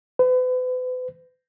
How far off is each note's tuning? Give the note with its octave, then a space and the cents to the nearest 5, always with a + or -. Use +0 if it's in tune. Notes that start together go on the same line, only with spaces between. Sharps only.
B4 +40